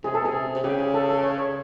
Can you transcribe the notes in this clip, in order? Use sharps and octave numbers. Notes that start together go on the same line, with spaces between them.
C3 G#4
B2 A4
G#4
C3
C3
C#3 G4
G#4
A4
A4
C#5
C#5